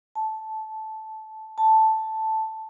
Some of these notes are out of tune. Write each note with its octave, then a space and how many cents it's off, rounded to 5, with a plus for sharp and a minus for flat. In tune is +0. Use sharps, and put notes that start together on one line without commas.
A5 -10
A5 +0